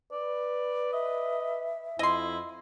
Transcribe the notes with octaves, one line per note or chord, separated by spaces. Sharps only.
B4 D5
D#5 E5
F2 E4 D#5 C6